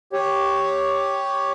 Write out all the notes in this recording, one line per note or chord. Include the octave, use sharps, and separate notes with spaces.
G4 C#5